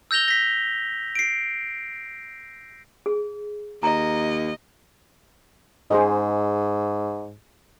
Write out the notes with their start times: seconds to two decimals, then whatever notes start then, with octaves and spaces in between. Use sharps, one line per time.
0.11 E6 G6 A#6 F7 G7
0.28 A#6 B6
1.15 C7 D7
3.06 G#4
3.83 D#2 D#5 A#5
5.91 G#2 G#4 C5 D#5